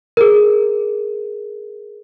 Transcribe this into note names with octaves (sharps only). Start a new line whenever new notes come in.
G#4 A#4